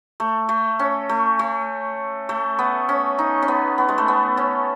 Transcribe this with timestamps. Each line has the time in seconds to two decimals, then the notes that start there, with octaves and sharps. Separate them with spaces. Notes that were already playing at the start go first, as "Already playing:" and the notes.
0.20 A3
0.49 A3
0.79 C#4
1.09 A3
1.39 A3
2.29 A3
2.59 B3
2.89 C#4
3.19 D#4
3.42 C#4
3.48 B3
3.78 B3
3.89 G#3
3.98 A3
4.08 B3
4.37 C#4